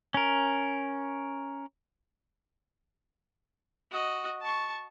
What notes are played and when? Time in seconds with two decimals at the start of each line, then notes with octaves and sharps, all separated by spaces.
0.14 C#4 A#4
3.91 F#4 D#5
4.41 A5 C#6